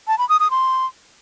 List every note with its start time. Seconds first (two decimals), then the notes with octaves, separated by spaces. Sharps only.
0.08 A5
0.18 B5
0.29 D#6
0.40 D#6
0.51 C6